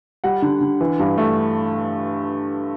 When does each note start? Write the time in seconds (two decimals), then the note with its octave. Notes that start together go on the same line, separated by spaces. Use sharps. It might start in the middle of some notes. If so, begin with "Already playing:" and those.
0.24 G3 F#5
0.42 D3
0.61 D3
0.81 E3
1.00 G2
1.18 A3